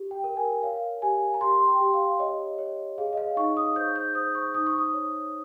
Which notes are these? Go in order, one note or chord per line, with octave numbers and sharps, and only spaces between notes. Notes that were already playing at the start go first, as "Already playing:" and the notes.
Already playing: G4
G5
A#4
G#5
C#5 F5
G4 G#5
A#5
G4 C6
G5
G4
F5
C#5 D#5
C#5
G#4 F5
D#5
F5
D#4 C#6
D#6
C5 G6
G6
C5 D#6
C#6
D#4 D#6
C#6
D#6
C#5